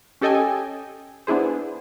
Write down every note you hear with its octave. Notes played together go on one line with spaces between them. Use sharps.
C#4 G4 A4 D#5 G5 G#5
B3 D4 E4 G#4 C5